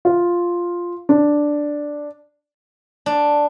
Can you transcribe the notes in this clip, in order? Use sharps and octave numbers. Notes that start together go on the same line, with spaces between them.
F4
D4
D4